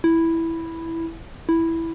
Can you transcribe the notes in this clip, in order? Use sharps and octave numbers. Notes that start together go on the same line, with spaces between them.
E4
E4